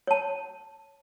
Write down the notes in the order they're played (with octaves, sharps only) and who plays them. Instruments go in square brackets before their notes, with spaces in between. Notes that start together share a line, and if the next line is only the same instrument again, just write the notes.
[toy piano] C#5 A5